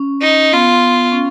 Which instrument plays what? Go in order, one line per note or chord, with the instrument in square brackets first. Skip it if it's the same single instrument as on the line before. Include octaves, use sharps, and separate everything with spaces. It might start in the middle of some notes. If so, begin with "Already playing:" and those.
Already playing: [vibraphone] C#4
[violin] D#4
[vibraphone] B3 [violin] F4
[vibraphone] C#4